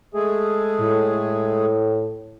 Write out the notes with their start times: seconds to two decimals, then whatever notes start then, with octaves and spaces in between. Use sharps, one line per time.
0.14 G#3 A3 G#4
0.81 A2